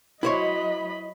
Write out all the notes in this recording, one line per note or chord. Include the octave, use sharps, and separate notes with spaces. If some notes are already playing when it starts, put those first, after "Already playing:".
F#3 E4 C5 C#5 D#5 B5